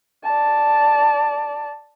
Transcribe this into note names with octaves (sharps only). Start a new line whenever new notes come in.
D5 A5